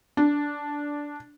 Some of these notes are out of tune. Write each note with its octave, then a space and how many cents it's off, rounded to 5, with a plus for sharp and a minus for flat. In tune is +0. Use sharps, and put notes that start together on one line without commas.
D4 -10